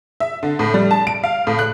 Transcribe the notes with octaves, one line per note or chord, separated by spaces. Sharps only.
E5
D3
A2
G3
A5
D7
F5
A2
F#6